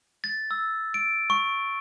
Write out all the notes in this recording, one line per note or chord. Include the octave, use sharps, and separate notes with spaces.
A6
E6
D7
C#6